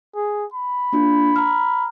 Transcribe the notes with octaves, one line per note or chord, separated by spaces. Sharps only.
G#4
B5
A#3 D4 F4
A#5 F6